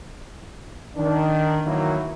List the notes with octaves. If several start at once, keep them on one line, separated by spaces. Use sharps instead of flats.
D#3 D4
D#3 E3 F#3 A#3 D#4 E4